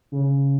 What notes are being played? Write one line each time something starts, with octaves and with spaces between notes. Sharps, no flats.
C#3